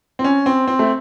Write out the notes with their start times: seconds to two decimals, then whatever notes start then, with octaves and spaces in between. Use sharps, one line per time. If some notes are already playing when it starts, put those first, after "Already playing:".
0.19 C4
0.24 C#4
0.46 C4
0.68 C4
0.79 A3